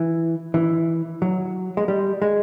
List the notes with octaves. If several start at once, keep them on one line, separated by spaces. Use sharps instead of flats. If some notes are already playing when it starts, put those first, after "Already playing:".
Already playing: E3
E3
F#3
G#3
G3
G#3